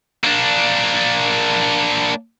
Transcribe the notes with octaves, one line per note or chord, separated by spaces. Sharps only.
A#3 D4